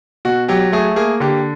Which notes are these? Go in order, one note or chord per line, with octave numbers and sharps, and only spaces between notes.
B2 F#4
F#3 G4
A3 G#4
A#3 G#4
D3 G4